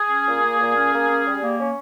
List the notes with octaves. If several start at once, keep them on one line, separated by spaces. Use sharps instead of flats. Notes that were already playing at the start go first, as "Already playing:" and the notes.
Already playing: G#4
C#4
A#2
A#3
A#2
C#4
A#3
C#4
G3
A#3
C#4